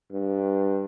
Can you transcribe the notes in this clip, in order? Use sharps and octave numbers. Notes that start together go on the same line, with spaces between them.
G2